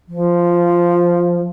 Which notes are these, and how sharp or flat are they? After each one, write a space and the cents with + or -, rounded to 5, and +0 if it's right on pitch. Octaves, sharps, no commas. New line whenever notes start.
F3 -5